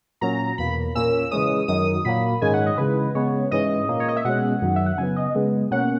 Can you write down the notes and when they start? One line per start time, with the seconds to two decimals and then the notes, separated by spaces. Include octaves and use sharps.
0.21 A#2 F#3 C#4 A#5
0.58 E2 B2 A#3 B5
0.95 A#2 A#3 C#4 E6
1.31 C#3 E3 G#3 C#4 D#6
1.68 F#2 D#3 F#3 D#6
2.05 A#2 F#3 A#3 B5
2.41 G#2 D#3 G#3 C#4 G#5
2.53 F#5
2.66 D#5
2.77 C#3 E3 G#3 B4
3.15 C#3 G#3 B3 C#5
3.51 G#2 E3 G#3 C#4 D#5
3.88 A#2 A#3 C#4
4.00 C#5
4.08 D#5
4.16 E5
4.25 B2 G#3 C#4 F#5
4.62 F#2 D#3 F#3
4.76 E5
4.86 F#5
4.98 C#3 F#3 B3 G#5
5.16 D#5
5.35 C#3 G#3 B3
5.71 B2 A#3 C#4 F#5